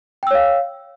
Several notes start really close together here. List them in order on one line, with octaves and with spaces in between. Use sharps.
G5 E6 C#5 F5